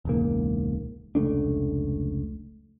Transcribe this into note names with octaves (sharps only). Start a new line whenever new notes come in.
E1 C#2 G#2 A#3
F1 C#2 A3 D4